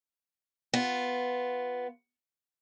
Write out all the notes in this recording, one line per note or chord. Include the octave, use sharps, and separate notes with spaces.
B3 F4